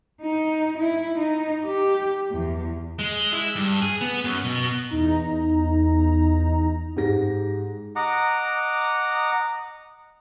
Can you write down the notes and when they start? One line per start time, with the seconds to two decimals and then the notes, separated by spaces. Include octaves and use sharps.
0.22 D#4
0.78 E4
1.18 D#4
1.65 G4
2.31 E2
2.99 G#3
3.33 E4
3.56 G2
3.82 G#4
4.01 B3
4.24 F#2
4.44 B2
4.89 E2 D#4 A#5
6.96 G#2 G#3 G4 A#6
7.96 D#5 F#5 A#5 D6